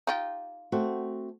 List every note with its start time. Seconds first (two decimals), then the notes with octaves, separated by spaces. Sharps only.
0.07 D#4 F4 G4
0.72 A3 C4 F#4